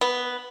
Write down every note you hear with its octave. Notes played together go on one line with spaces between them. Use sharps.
B3